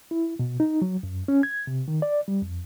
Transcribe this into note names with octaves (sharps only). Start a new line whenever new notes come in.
E4
B2
D#4
F#3
F#2
C#4
G#6
C3
D#3
D5
G3
F2